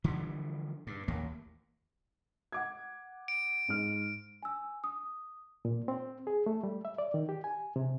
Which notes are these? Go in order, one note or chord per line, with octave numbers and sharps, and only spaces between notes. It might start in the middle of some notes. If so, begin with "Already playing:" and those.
D3 E3 F3 G3
G2
A1 D#2 A#3
F#5 D6 G#6
D7
G#2 F6
G#5 E6
D#6
A#2
C4
G#4
A3
G3
E5
D5
D#3
G4
G#5
C3